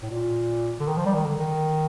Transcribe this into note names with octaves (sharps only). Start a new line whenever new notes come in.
A2
A#2
D3
D#3
F3
G3
D#3
D3
D#3